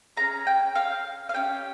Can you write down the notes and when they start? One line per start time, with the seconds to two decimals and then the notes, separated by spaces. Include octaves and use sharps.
0.17 C#4 G#4 A#5
0.47 G5
0.75 F5
1.29 F5
1.34 C#4 G4 G5